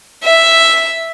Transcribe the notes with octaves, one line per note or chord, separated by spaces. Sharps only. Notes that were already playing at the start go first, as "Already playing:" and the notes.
E5